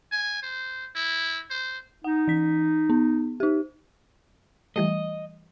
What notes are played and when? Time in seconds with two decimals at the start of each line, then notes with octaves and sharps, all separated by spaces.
0.12 G#5
0.43 C5
0.95 E4
1.50 C5
2.04 D#4 F#5
2.28 E3 B6
2.90 B3
3.40 D#4 G4
4.76 E3 G3 A3 D#5